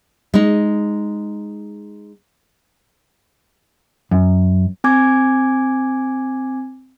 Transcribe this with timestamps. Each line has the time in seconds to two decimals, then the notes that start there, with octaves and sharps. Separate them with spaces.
0.34 G#3 D#4
4.11 F#2
4.84 C4 G#5 D6 G#6